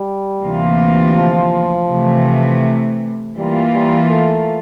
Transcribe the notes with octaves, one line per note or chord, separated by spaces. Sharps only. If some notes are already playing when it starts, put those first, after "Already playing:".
Already playing: G3
D2 C3 E3 A#3 F4
F3
C3 E3 A3
E3 G3 A#3 F4
G3
A3